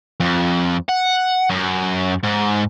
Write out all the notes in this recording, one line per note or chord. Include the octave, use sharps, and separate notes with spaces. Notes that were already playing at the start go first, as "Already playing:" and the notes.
F2
F#5
F#2
G#2